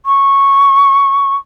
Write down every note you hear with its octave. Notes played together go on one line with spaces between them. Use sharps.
C#6